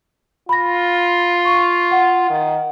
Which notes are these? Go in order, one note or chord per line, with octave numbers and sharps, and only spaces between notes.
F4 B5 A#6
C#6
F#5
D#3